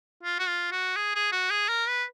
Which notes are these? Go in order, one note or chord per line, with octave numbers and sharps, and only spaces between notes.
F4
F#4
F4
F#4
G#4
G#4
F#4
G#4
A#4
B4